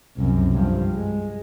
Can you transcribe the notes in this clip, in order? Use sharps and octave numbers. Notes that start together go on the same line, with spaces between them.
C2 F#2
G2 F3
G#3